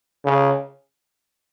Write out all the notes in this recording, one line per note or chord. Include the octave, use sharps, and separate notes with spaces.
C#3